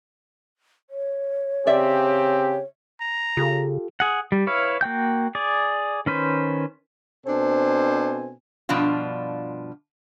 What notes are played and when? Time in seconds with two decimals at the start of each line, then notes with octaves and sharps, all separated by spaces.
0.90 C#5
1.67 C#3 C4 G4 D5 E5
3.00 A#5
3.37 C#3 F4 G4 A4
4.00 G#4 F#5
4.32 G3
4.47 E4 B4 C#5 F5
4.81 A#3 F#4 G5 G6
5.35 G#4 D5
6.06 D#3 C#4 B4 C5
7.27 B2 C4 D4 A4 C5 G#5
8.69 G2 B2 F3 D4 F4